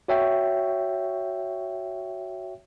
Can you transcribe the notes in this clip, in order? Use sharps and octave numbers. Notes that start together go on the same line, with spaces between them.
F#4 C#5 E5 G5